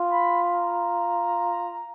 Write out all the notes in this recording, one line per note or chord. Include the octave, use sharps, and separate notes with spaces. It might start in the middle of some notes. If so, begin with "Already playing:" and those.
Already playing: F4
B5
A#5